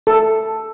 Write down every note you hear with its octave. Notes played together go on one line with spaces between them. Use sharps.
A4